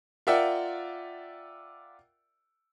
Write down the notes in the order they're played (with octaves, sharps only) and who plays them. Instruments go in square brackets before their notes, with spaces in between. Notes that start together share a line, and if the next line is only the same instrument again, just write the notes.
[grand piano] F4 A#4 D5 E5 F#5 G5